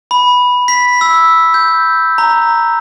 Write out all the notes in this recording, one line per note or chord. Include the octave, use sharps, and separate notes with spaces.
B5
B6
E6
G6
A#5